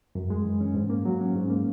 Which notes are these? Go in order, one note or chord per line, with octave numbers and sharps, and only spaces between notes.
F#2
G#3
E3
C#4
G#2
A#3
F#3
C#4
G#2
A#3